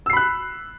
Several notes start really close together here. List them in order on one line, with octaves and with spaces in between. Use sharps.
E6 C7 B5 F#6